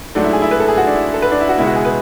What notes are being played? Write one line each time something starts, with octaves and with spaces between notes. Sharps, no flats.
G#2 F#3 A3 D4
E4
G#4
E4
B4
A4
G#4
F#4
D4
E4
A4
B4
D4
E4
F#4
C#2 B2 G#3 B3 E4
F#4
G#4
B4